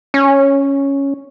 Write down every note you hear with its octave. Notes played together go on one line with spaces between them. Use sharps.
C#4